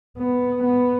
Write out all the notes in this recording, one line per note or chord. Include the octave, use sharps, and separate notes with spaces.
B3
B3